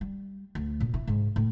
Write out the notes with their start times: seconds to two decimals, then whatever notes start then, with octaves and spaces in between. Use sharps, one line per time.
0.01 G3
0.55 D2
0.80 A#2
0.94 E4
1.08 G#2
1.36 A2